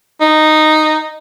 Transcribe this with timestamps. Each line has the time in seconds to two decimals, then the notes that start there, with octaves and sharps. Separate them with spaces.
0.21 D#4